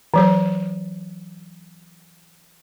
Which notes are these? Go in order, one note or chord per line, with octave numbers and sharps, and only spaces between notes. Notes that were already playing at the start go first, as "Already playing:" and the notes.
E3 F#3 C5